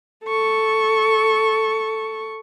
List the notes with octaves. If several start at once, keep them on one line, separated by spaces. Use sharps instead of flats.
A4 C#6